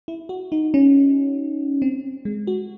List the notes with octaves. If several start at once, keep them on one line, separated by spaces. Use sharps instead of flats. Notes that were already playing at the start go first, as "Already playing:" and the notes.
E4
F#4
D#4
C#4
C4
G#3
F#4